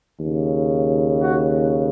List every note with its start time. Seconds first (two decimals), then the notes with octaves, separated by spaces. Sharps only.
0.18 D#2 C#3
1.21 F#4